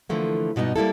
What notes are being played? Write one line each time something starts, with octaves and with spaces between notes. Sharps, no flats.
D3 E3 F3 A3 A#3
G2 B2 B3 D#4
G3 A#3 E4 A4